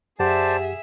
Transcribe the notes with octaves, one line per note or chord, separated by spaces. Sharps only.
F#2 G4 G#4 C5 D5 E5 F#5 A5